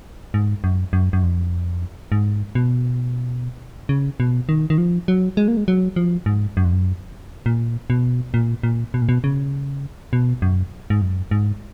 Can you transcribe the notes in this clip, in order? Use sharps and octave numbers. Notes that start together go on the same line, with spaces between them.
G#2
F#2
F#2
F#2
F2
G#2
B2
C#3
B2
D#3
D#3
F3
F#3
G#3
A#3
G#3
F#3
F3
G#2
F#2
F2
F#2
A#2
B2
A#2
A#2
B2
A#2
B2
C#3
B2
F#2
G#2
F#2
G#2